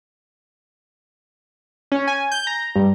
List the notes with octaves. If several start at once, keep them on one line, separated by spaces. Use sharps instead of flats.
C#4
G#5
G6
A#5
G2